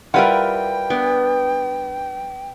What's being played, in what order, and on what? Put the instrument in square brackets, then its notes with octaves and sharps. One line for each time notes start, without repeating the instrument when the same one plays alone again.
[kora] G3 E4 F4 [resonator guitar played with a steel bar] A#4 B4 F#5 [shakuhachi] G5
[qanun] B3 D4